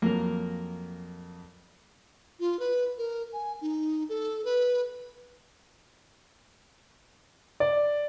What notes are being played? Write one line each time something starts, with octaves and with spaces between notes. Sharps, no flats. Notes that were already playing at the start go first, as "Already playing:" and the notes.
F2 F#3 A#3 A#4
F4
B4
A#4
G#5
D#4
A4
B4
D5